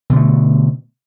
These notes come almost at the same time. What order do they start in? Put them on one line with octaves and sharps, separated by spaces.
B2 D3 A3